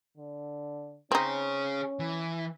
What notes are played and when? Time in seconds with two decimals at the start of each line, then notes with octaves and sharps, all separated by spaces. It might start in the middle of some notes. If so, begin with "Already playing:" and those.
0.17 D3
1.12 C4 C#4 D#4 G#4 C#5
1.99 E3